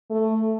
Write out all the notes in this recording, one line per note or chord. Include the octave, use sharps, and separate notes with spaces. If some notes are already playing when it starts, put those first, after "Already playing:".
A3